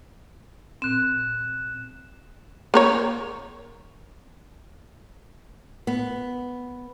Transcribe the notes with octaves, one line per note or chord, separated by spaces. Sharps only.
A#2 C4 F#6 E7
A#3 A#4 C#5
B3